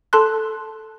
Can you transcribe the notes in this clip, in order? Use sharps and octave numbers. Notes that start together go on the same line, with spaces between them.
A4 A5 C6 F#6